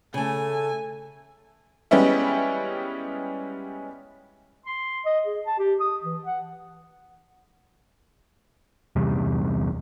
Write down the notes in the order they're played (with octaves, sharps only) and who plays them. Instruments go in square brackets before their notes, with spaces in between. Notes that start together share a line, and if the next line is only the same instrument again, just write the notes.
[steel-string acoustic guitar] C#3 A3 [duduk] A4 [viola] G#5
[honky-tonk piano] G3 G#3 B3 C#4 E4
[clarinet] C6
D#5
G#4
A5
G4
D#6
E3
F#5
[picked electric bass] E2 C3 G3